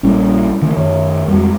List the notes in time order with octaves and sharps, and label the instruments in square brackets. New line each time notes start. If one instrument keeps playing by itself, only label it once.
[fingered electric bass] A#1 G3 [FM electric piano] C#4 E4
[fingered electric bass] D3 D#3 A3
[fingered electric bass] F#2 D#3 [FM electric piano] C#5
[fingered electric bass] F2 G#3 [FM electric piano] G3 F#4